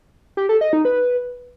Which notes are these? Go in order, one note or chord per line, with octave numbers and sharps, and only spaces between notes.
G4
A4
D#5
D#4
B4